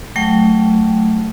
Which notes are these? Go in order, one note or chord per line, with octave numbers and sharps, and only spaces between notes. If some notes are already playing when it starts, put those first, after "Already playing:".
F#3 A3 G5